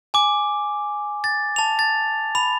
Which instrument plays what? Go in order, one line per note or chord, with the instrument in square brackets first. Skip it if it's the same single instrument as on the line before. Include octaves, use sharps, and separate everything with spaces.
[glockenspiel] G#5 D6
A6
A5 F7
A6
B5 F7